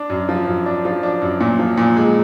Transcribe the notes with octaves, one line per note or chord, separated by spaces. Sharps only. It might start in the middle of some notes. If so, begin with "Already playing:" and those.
Already playing: D4
F#2
F3
F#2
D4
F3
D4
F#2
A#2
F3
A#2
G#3